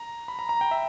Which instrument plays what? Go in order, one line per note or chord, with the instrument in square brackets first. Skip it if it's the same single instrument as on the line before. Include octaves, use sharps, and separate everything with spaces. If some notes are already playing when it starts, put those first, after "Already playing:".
Already playing: [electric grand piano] A#5
B5
A#5
A#5
G5
E5